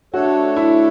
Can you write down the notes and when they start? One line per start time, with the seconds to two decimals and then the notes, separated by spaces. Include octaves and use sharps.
0.14 A3 D4 F#4 A4 C#5
0.56 E4